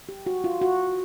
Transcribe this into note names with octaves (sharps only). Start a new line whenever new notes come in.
G4
F#4
F4
F#4